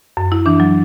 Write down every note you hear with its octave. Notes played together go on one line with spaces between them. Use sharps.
F#2
E4
E3 D4
F#3